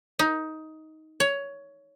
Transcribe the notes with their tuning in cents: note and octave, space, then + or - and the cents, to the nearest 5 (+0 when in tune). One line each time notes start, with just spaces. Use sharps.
D#4 +15
C#5 +15